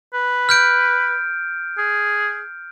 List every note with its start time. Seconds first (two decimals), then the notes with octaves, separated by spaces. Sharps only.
0.14 B4
0.49 F6 G6 D7
1.78 G#4